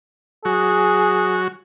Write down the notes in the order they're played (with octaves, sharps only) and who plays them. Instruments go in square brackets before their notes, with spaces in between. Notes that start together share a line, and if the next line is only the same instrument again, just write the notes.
[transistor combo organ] F#3 F#4 [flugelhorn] G#4